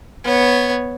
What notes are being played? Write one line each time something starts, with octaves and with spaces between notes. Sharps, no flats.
B3 C#5